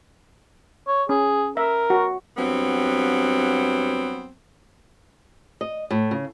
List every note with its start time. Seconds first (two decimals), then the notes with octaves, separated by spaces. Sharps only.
0.87 C#5
1.09 C#4 G#4
1.57 A#4 E5
1.90 F#4
2.36 G2 F#3 B3 C4
5.61 D#5
5.91 A2
6.11 C#3